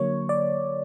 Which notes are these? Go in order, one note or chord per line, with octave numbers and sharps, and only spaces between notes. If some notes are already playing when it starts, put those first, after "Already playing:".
Already playing: D3 F#3 A#3 C#5
D5